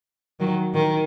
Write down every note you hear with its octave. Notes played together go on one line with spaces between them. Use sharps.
D#3 F#3
D#3